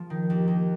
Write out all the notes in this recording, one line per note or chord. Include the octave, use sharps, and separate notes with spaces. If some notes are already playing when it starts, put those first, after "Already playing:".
Already playing: F3
D#3
D#2
D#2